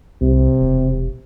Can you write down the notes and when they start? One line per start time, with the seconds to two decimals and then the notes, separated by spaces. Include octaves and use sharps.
0.21 C2 C3
0.60 E1